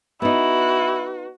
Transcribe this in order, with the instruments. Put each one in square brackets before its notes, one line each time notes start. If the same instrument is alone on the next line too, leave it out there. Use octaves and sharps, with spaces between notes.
[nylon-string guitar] B3 D#4 [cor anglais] E4 [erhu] F#4